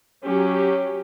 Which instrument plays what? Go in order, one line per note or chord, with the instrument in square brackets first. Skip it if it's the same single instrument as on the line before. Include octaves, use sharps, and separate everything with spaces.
[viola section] F#3 C#4 G4